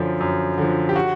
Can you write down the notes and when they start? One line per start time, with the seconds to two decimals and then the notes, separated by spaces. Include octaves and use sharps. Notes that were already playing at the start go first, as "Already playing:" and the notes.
Already playing: F#2 D3 F3 D4
0.21 F#2
0.58 D3 F3
0.89 G4
0.96 F#4